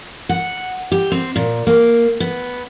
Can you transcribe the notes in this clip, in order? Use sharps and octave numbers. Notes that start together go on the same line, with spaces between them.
F#5
G4
C4
A#2
A#3
B3